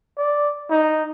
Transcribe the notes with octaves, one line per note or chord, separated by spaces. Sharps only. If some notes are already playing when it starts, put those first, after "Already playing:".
D5
D#4